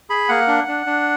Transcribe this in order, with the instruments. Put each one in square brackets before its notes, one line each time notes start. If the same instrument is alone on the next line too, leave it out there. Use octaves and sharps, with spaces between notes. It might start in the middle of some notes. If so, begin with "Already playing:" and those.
[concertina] G#4 B5
A#3 F#5
D4
D4
D4